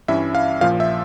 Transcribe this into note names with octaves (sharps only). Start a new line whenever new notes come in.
G2 E3 G3 C#4 E4 E5
F5
A#1 A#2 F3 F5
E5